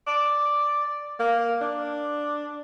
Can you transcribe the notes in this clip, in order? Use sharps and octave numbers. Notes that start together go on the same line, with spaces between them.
D5
A#3
D4